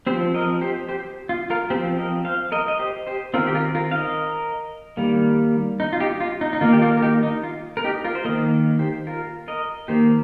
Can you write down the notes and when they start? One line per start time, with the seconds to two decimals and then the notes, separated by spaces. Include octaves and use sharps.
0.06 F3 C4 G4 C5
0.34 A#4 D#5
0.61 G4 C5
0.88 G4 C5
1.29 F4
1.50 F4 A#4
1.70 C4 G4 C5
1.75 F3
1.98 A#4 D#5
2.25 C5 F5
2.52 A#4 D#5
2.68 D#5
2.79 G4 C5
3.07 G4 C5
3.34 C4 F4 A#4
3.37 D#3
3.47 G4
3.55 F4 A#4
3.75 F4 A#4
3.91 F5
3.96 A#4 D#5
4.97 D#3 G3 A#3
5.80 D#4
5.93 F4
6.00 D#4 G4
6.20 F4
6.41 D#4
6.53 D#4
6.61 D#3 A#3 F4
6.73 G4
6.82 F4 A#4
6.97 A#4
7.02 D#4 G4
7.23 D#4
7.43 F4
7.77 A#4
7.84 D#4 G4
8.04 F4 A#4
8.15 C5
8.25 A#3 A#4 D#5
8.28 D#3
8.79 G4 C5
9.07 F4 A#4
9.48 A#4 D#5
9.88 D#3 A#3 G4 C5